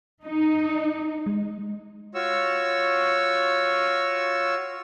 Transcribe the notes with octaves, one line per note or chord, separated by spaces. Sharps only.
D#4
G#3
F4 F#4 C#5 C#6 E6